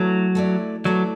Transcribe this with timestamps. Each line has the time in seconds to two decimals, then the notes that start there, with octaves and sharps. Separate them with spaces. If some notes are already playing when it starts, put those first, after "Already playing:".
Already playing: F#3 A3 E4 D5
0.35 A3 E4 D5
0.84 F#3 A3 E4 D5